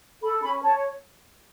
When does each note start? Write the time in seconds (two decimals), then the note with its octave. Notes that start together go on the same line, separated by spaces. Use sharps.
0.21 A4 B5
0.42 C#4 B5
0.62 C#5 A5